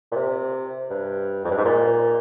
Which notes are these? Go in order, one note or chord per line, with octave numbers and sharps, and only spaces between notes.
A#2
C3
G2
F2
G2
G#2
A#2